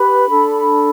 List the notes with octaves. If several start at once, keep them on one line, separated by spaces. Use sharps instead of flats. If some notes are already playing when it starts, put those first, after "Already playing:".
Already playing: G4 B4 B5
D4 A4